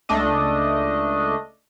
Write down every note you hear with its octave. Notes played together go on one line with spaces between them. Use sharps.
C#2 A3 D4 D#5